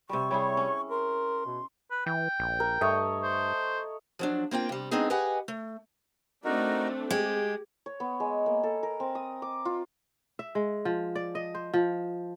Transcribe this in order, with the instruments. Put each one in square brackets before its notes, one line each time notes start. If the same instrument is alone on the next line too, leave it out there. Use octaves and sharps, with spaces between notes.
[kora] C3 G3 [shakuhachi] C#6
[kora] G3 E4 G#4 [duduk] C#5
[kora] C#4
[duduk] A#4 [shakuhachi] C6
[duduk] B2
[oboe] B4
[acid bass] E3 [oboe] G5
[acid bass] A#1
[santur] A#4
[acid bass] G2 [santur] A3 C#5 D#5
[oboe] C5
[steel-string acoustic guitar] F3 F#3 D4
A#3 C4 F4 G5
C3 G3
G#3 B3 C4 D4 D#4 G#4
G4 G#4 B4 D#5 F#5 G#5
A3
[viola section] A3 D4 [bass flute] C4 [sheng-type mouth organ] D#4 F#4 A#4
[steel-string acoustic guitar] G#3 [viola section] G4 [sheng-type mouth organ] G5
[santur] C#5
B3
G#3
A#3
A4
A#4
C4
D#6
D6
F4
[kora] E5
G#3
F3
D5
D#5
C5
F3